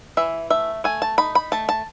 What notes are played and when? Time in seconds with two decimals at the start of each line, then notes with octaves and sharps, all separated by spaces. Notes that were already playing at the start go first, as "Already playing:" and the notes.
0.17 E3 E5
0.50 A3 E5
0.84 A3 G#5
1.02 A5
1.18 D#4 B5
1.35 B5
1.52 A3 A5
1.69 A5